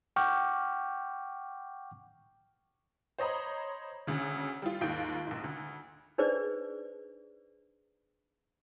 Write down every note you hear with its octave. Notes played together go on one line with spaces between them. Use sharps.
F#5 G5 C#6 D6 F6 G6
C5 C#5 D#5 A#5 B5
D2 C#3
G3 F4
D#2 G#2 F4 G6 D7
A#1 G#2
D2
D4 D#4 G#4 B4 C5 D5